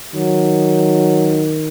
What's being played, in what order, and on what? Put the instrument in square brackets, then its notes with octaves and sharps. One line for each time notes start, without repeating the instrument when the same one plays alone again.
[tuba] D#3 [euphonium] F#3